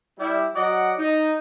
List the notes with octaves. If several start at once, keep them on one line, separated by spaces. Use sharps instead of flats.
G3 E4
F#3 D5 D#5 F#5
D#4